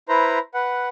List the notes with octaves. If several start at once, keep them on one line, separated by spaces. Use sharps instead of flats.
E4 B4 C5 A#5
B4 F#5